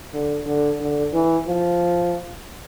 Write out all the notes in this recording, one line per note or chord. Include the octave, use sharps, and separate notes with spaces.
D3
D3
D3
E3
F3